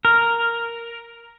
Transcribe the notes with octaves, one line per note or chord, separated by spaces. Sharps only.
A#4